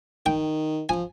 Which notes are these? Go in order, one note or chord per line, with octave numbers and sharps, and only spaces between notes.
D#3 G5
F3 G#5